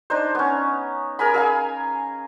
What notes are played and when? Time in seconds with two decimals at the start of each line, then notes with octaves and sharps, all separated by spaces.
0.10 D4 D#4 C5
0.35 B3 C#4
1.19 G#4 A#4 G#5 B5
1.34 G#4 F5 G#5